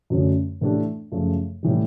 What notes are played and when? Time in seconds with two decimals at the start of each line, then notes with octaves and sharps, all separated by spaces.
0.10 F#2 D3 F#3 A3 C#4
0.61 A2 E3 A3 D4 G4
1.12 F#2 C#3 F3 A3
1.63 A2 E3 G3